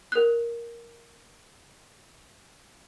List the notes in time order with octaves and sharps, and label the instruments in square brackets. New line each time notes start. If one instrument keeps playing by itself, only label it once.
[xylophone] A#4 F#6